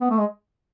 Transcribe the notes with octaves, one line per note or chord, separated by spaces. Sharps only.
B3
A3
G#3